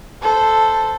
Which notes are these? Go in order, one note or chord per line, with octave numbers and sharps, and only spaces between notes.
A4 C5